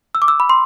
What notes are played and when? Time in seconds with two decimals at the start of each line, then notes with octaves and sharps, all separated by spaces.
0.15 E6
0.22 D6
0.28 E6
0.40 B5
0.50 C6